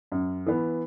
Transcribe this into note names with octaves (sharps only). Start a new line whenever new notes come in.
F#2
E3 B3